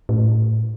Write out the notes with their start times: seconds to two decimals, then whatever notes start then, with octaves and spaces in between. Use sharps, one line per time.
0.09 A2